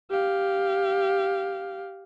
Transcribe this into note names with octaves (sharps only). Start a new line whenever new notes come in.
G4 F5